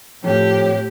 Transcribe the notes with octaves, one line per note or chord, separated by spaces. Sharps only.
F2 A2 G4 C#5